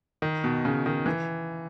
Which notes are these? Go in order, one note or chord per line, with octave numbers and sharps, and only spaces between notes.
D#3
B2
C#3
D#3
E3